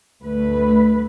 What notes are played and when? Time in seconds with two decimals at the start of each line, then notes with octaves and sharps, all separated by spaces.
0.23 D2 A3 B4